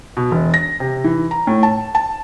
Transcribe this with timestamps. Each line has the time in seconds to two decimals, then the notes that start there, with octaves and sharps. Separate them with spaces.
0.17 B2
0.31 E1
0.54 A#6
0.80 C3
1.04 E3
1.31 A#5
1.47 A2
1.63 A5
1.95 A5